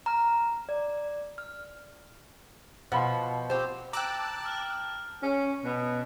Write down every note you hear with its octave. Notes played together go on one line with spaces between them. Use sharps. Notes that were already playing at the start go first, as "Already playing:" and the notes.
A#5 F6
D5
F6
B2 F3 F#5 B5 C6
C4 G4
G5 A5 A#5 D6 E6 F#6
F6
C#4
B2